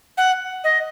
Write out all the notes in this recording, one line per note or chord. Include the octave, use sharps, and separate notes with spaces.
F#5
D#5